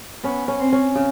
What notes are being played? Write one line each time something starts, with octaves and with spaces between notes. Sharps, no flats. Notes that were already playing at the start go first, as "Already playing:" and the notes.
B3 C#4
C#4
C4
C#4
C#3